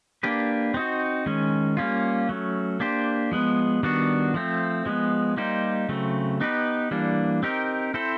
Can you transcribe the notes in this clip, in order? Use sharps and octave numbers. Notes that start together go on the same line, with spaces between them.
A#3 D4 G4 B4
C4 D#4 F#4
D#3 G#3 C#4
G3 A#3 C#4 F4
F#3 A3 C#4
A#3 D4 G4 C5
F3 G#3 B3
D#3 G3 B3 D4 F#4
F3 A3 C4
F3 G#3 B3
G3 A#3 D#4 G4 C5
C#3 F#3 A3 C4
B3 D#4 G4 B4
E3 G3 A#3 D4
C4 D#4 G4 A#4
C4 E4 A4 C5